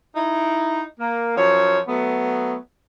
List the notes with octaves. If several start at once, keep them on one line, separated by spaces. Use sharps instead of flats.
D#4 E4
A#3
F#2 F3 C#5
F#3 A3 B3